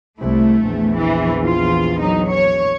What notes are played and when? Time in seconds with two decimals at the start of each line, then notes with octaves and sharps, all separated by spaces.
0.20 C2 A3 E4
0.63 A#1 E2
0.97 E3
1.46 F4
2.00 F#3 D#4
2.30 C#5